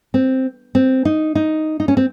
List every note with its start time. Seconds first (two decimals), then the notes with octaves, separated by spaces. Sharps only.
0.14 C4
0.75 C4
1.05 D#4
1.35 D#4
1.80 D#4
1.88 C#4
1.97 C4